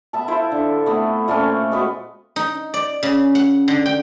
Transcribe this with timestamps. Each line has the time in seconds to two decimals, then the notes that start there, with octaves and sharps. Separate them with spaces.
0.13 B3 E5 A5
0.28 E4 F4 C5 E5
0.52 D3
0.86 A3 B3 C4
1.28 A#2 A3 C4 C#4
1.72 G#3 B3 F#4
2.36 D#4
2.74 D5
3.03 C#3
3.35 F#5
3.68 D3
3.86 G5